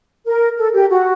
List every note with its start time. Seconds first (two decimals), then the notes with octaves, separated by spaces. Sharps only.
0.26 A#4
0.57 A4
0.73 G4
0.90 F#4